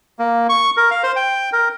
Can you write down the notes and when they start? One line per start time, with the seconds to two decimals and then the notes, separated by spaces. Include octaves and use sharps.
0.19 A#3
0.49 C#6
0.77 A#4
0.91 F5
1.03 C5
1.16 G5
1.53 A#4